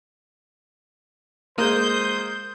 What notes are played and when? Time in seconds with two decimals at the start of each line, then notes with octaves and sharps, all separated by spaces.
1.58 G#3 A#3 C5 D#6 G6